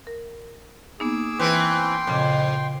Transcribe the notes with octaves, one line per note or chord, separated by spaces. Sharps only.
A#4
A#3 B3 D#4 G#4 D6 E6
E3 C4 B4 G5 C6
F2 A#2 C#3